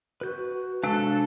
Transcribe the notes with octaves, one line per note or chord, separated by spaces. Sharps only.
F#4 B4 G6
C3 G#3 D4 A4 F5 F#6